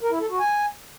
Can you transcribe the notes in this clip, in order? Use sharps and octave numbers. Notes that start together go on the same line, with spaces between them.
A#4
E4
A4
F#4
G#5